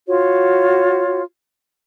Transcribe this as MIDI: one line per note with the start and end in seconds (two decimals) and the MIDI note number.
0.07 1.22 65
0.07 1.22 66
0.07 1.22 73